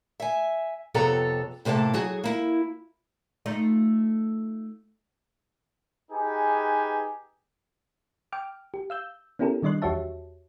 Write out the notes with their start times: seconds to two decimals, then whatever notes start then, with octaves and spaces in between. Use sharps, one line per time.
0.20 E5 G#5
0.94 F2 C3 B3 A4 C#5 A#5
1.65 A2 C3 A#3 A4 A5
1.94 F#3 F#4 G#4
2.24 A#3 E4
3.46 A3 D#4 F4
6.12 D#4 G4 G#4 B4 G#5
8.32 G5 D6 F6
8.74 G4
8.90 F5 E6 G6
9.39 B3 C#4 E4 G4 A4 A#4
9.63 D#3 G3 D4 D#5 C6 F#6
9.82 E2 F#4 G4 C#5 E5 A5